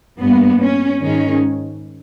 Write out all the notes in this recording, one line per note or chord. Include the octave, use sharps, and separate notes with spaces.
G2 G3 A#3 B3
C#4
G#2 D#3 G#3 C#4